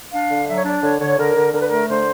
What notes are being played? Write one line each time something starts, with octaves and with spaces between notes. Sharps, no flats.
D4 F5
D3
F#3 E5
C#5
D4 D5
D3 C#5
D3 C#5
D3 A#4
D3
D3 A#4
B4
A3 A#4
D3 C5